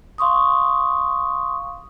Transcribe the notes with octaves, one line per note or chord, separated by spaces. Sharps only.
F5 C6 C#6 D#6